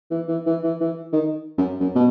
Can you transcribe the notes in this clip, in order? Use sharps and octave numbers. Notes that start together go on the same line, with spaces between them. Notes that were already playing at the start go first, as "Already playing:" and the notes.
E3
E3
E3
E3
E3
D#3
F#2
F#2
B2